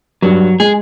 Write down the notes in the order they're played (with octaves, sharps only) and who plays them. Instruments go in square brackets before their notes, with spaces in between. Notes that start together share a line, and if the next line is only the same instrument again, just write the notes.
[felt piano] G2 [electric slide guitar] F#3
[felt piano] G#3 [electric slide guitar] G#4